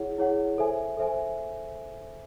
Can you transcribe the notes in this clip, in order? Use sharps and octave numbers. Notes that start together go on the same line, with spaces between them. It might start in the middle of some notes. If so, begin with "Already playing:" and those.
Already playing: E4 G#4 C#5 F#5
E4 G#4 C#5 F#5
A4 C5 E5 G#5
A4 C5 E5 G#5